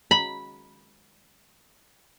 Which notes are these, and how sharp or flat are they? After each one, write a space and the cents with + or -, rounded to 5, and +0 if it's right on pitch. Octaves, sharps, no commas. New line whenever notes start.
B5 -10